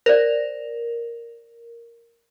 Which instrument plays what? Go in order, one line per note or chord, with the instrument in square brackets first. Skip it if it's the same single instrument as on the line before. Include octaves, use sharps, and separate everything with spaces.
[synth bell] A#4 [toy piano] C5 D5